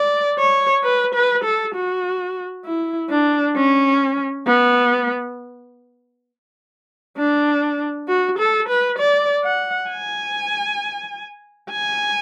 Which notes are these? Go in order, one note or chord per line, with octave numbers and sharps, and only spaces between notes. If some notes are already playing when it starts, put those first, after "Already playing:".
Already playing: D5
C#5
B4
B4
A4
F#4
E4
D4
C#4
B3
D4
F#4
A4
B4
D5
F#5
G#5
G#5